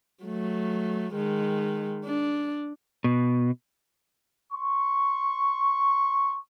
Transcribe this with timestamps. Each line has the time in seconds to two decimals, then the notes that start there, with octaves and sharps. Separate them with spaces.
0.24 F#3 A3
1.14 D#3 G#3
2.05 D4
3.04 B2
4.52 C6 C#6